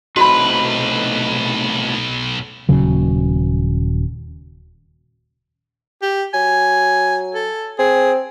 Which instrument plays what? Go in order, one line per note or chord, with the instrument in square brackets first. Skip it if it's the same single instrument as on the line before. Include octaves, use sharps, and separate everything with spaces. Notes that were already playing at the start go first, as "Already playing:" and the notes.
[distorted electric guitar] B1 B4 [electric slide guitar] A2 C3 D#4 [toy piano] F#4 B5
[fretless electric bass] D#1 C#3 F#3
[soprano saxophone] G4
[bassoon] F#3 [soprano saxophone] G#5
[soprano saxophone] A4
[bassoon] C4 [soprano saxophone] G#4